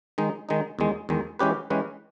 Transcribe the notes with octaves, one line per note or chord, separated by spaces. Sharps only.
D#3 G#3 D#4
D#3 G#3 D#4
E2 D#3 G#3
E2 D#3 G#3
E3 G#3 C#4 G4 B4
E3 G#3 C#4 G4 B4